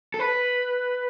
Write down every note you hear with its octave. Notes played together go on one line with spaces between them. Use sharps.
A4
B4